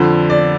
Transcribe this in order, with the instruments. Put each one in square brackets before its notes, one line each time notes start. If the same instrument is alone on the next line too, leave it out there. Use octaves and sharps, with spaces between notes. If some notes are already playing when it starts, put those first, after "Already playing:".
Already playing: [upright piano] F2 D3 F3 A4
D5